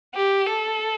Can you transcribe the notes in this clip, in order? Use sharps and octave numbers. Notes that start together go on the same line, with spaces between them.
G4
A4